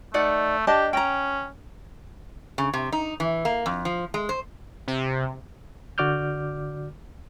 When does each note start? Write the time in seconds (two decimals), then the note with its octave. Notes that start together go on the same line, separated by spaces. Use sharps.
0.14 A3 D#4 D5 F#5
0.67 D4 G4 D#5 A5
0.93 C#4 G5 A#5
2.58 C#3
2.74 C3
2.93 D#4
3.20 E3
3.45 A#3
3.66 F2
3.85 F3
4.14 G#3
4.29 C5
4.88 C3
5.98 D3 F#4 D5 D6 F6 G6